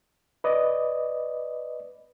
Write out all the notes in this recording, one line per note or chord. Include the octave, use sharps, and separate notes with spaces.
B4 D5 D#5